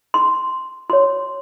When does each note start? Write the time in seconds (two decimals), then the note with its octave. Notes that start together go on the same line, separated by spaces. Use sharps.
0.14 C6
0.90 F#4 C#5 C6